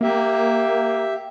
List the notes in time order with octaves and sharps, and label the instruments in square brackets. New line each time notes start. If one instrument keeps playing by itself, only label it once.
[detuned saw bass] A#3 [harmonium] G4 E5